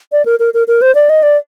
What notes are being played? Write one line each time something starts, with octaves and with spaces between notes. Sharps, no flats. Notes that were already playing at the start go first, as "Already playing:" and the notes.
D5
A#4
A#4
A#4
A#4
C5
D5
D#5
D5